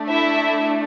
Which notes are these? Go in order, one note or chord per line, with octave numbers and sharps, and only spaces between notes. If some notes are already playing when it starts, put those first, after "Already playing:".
Already playing: A3 D4
E4 E5